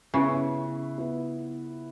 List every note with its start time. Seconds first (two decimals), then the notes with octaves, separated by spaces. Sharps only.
0.14 C#3 B3 E4 B4
0.97 B3 E4 B4